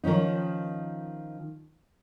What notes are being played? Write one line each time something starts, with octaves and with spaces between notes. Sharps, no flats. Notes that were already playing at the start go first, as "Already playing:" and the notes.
D#3 F3 C#4 D#4